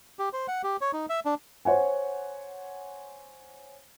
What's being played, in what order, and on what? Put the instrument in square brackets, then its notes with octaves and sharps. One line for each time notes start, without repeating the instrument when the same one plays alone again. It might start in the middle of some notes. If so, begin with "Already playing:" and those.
[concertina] G4
C5
F#5
G4
C#5
D#4
E5
D4
[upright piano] C5 C#5 F#5 G#5